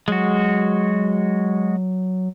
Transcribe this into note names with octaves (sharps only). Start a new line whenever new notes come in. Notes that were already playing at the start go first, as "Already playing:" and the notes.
F#3 G#3 F#4